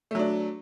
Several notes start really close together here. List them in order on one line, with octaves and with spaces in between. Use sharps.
A3 F#3 D4